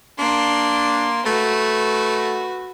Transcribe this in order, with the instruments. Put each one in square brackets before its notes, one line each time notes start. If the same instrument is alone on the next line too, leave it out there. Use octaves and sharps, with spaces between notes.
[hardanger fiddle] A#3 C6 [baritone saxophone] D4
[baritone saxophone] A3 [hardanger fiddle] F#4 B4